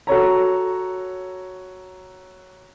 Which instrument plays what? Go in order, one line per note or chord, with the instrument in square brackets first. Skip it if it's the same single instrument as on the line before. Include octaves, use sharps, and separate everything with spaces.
[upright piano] F#4 A4 C#5 A#5